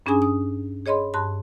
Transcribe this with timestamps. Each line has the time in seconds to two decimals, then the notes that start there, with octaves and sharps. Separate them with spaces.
0.06 G2 C#4 D4 G#4 G#5 D#6
0.22 D#6
0.86 G#4 C#5 D#5 B5 C6
1.14 G2 A5 C6 F#6